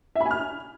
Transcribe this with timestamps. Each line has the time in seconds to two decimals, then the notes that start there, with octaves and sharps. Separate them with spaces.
0.15 E5
0.21 B5
0.26 G#5
0.31 F6